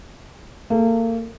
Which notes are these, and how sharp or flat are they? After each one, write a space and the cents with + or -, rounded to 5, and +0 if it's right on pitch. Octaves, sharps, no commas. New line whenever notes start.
A#3 -35 A4 -40